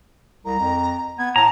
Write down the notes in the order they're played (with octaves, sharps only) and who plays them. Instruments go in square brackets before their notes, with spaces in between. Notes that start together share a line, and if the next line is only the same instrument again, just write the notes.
[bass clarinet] C2 [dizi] A#5
[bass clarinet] F2
[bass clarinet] B3 [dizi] G#6
[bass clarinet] A2 [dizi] A5 [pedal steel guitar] A#5